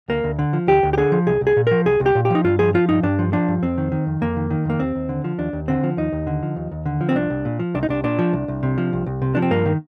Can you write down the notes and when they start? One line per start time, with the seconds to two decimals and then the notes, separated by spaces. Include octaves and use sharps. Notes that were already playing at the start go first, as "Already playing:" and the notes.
0.08 D2 A#3
0.24 D2
0.39 D3
0.53 F3
0.67 D2 G4
0.83 D2
0.93 G4
0.97 D3 G#4
1.12 F3
1.27 C2 G#4
1.41 C2
1.47 G#4
1.56 A#2
1.67 F3 A#4
1.85 C2 G#4
2.00 C2
2.06 G4
2.15 A#2
2.25 G4
2.30 F3 D#4
2.44 G2 F4
2.59 F3 G#4
2.74 F3 F4
2.89 G2 D#4
3.03 G2 D4
3.19 F3
3.33 F3 D4
3.48 G2
3.62 F2 C4
3.78 D#3
3.92 D#3
4.07 F2
4.21 F2 A#3
4.37 D#3
4.50 D#3
4.65 F2 A#3
4.80 D#2 C4
4.95 D#2
5.09 D3
5.24 F3
5.38 D#2 D4
5.53 D#2
5.68 D3 C4
5.84 F3
5.97 D#2 D#4
6.12 D#2
6.27 D3
6.43 F3
6.56 D#2
6.71 D#2
6.86 D3
7.01 F3
7.09 C4
7.16 C2 D4
7.30 C2
7.45 A#2
7.59 F3
7.74 C2 D4
7.83 D#4
7.89 C2 D4
8.04 A#2 D4
8.19 F3
8.33 C2
8.48 C2
8.63 C3
8.78 F3
8.93 C2
9.06 C2
9.22 C3
9.35 F3 D4
9.42 C4
9.51 G2 A#3
9.66 D#3